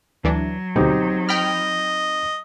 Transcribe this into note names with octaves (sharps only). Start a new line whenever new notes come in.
D2 E3 F#3 D4
D2 B2 C4 D#4 G4
D#5 G5 B5 F6